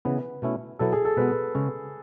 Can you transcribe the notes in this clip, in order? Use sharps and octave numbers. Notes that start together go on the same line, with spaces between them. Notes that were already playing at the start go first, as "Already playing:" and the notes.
C#3 E3 B3 B4
B2 A3 C#4 E4
B2 F#3 B3 E4 A4
G#4
A4
B2 G#3 B3 B4
C#3 G#3 C#4